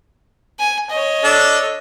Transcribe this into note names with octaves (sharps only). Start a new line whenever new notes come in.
G#5
C#5 D#5
D4 A4